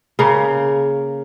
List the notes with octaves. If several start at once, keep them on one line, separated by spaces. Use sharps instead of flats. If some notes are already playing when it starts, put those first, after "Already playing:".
C#3 A#3